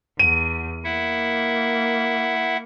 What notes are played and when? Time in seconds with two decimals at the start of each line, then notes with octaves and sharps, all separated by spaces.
0.19 E2 D#7
0.84 A#3 E4 E5 F#5